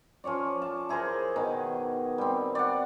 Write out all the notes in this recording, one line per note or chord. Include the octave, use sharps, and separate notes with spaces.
F3 C#4 C#5 D5
A5
E4 G#4 A#4 C5
B2 D#3
G3 C4
D5 F#5